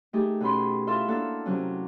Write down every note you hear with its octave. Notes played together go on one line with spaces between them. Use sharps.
A3 D#4 G4 G#4
B2 C#4 B5 C6
E4 F4 A4 E5 C6
A#3 D4 A4 F#5
C3 F#3 C#4